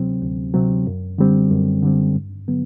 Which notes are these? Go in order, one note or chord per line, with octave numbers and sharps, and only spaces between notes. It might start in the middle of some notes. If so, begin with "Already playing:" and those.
Already playing: D2 C3 F#3 C4
D2
C3 F#3 C4
F#2
D3 G3 C4
F#2
D3 G3 C4
G2
D3 F#3 B3